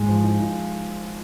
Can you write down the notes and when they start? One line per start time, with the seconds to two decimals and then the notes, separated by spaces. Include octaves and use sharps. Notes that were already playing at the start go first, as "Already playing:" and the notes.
Already playing: G#2 G#3
0.09 F3
0.23 D#4
0.40 D#4